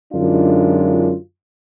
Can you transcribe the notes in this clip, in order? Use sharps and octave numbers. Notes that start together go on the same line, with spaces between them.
F#2 D3 G#3 D4 D#4 F4